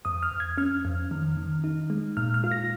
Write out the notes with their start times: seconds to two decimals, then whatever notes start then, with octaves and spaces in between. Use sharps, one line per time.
0.05 F2 D#6
0.23 F6
0.31 F2
0.40 G#6
0.58 C#4 F6
0.85 F2
1.11 D#3
1.37 D#3
1.64 D#4
1.90 G#3
2.17 A#2 F6
2.34 F6
2.44 F4
2.52 A#6